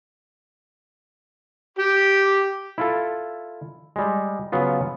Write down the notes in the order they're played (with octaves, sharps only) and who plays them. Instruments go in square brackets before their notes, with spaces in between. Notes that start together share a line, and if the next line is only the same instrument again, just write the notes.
[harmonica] G4
[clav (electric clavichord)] E4 F4 A4
G3 G#3
C#3 F#3 B3 F4